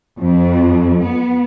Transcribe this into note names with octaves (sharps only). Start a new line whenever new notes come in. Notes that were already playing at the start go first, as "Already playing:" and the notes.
F2
B3